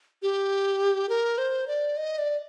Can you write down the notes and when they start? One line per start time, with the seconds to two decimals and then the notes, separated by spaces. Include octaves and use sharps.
0.22 G4
1.09 A#4
1.38 C5
1.68 D5
1.97 D#5
2.19 D5